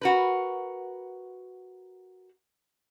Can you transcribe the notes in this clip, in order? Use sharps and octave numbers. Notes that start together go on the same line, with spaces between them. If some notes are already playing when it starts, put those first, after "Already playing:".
F#4 A#4 B4